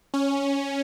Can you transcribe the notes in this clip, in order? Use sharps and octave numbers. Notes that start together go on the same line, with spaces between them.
C#4